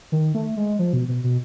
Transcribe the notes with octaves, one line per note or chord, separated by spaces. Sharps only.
D#3
A3
G#3
F3
B2
B2
B2